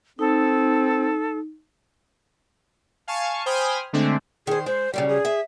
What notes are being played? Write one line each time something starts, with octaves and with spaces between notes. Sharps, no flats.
C4 D#4 A4
F5 G#5 A5 C#6
C5 G5 G#5 B5 D#6 F6
D3 G#3 A3 C4 D4
D#3 G#4 C5
G#3 C5
C#3 F#3 G3 G5
G#4
E5